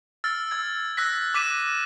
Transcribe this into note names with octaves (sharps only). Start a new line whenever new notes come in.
E6 F6 A6
E6 G#6
E6 F#6 A#6 B6
D6 F#6 B6 D#7 E7